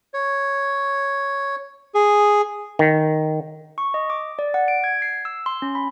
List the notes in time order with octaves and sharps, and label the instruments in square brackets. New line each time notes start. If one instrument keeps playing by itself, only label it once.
[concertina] C#5
G#4
[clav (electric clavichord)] D#3
[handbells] C#6
D#5
D6
D5
F#5
D7
G#6
C7
E6
C6
C#4
B5